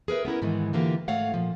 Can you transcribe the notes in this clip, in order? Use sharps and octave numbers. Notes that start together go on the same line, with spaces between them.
G#4 A#4 B4 E5
B3 C#4 E4 A#4
G#2 D#3 E3 G#3
D3 E3 A#3 F4 G4
G#2 A3 C#5 F5 F#5
A#2 F3